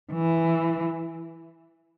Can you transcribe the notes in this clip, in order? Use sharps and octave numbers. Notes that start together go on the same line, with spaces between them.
E3